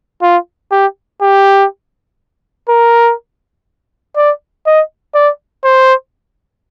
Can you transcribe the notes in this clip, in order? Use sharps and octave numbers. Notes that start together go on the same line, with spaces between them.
F4
G4
G4
A#4
D5
D#5
D5
C5